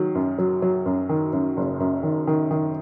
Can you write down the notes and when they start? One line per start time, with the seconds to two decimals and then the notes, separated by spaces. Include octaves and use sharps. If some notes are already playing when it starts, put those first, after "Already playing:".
Already playing: D#3 F#3
0.15 F#2
0.39 F#3
0.62 F#3
0.86 F#2
1.09 D#3
1.33 F#2
1.57 F#1
1.80 F#2
2.03 D#3
2.27 D#3
2.51 D#3